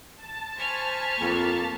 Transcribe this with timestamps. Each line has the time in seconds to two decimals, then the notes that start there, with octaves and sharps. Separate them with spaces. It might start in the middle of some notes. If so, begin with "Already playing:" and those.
0.16 A5
0.57 C5 G#5 B5 C#6 F6
1.21 F2 A#3